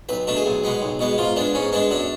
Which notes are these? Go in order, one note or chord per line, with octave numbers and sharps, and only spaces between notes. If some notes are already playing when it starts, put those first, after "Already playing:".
B1 B4
B2 A3 D4
G#4
B1
B2 G#3 B3
B1
B2 G#3 B3
G#2 F4
G#3 B3 D4
G#2 C#4
G#3 B3 D4
F#2 D4